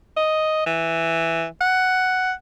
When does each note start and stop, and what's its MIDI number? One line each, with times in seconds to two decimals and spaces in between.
0.17 0.62 75
0.66 1.45 52
1.61 2.32 78